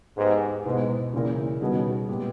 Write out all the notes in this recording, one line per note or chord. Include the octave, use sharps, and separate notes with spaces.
G#2 B3 G4 B4 D#5
G#2 B2 G#3 B3 E4
A#2 C#3 E3 A#3 E4 A#4
B2 D#3 G3 C#4 G#4 D#5
A#2 G#3 B3 G4